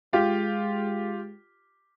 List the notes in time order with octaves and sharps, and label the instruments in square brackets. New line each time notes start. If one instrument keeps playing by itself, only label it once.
[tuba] G#3 [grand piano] F4 G4